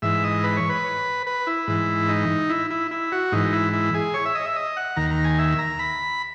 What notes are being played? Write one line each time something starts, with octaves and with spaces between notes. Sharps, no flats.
G#2 E3 E5
D#5
B4
C#5
B4
B4
E4
G#2 E3
D#4
E4
E4
E4
F#4
G#2 E3 D#4
E4
E4
G#4
C#5
E5
D#5
E5
D#5
F#5
D#2 D#3 A#5
A#5
G#5
E5
A#5
B5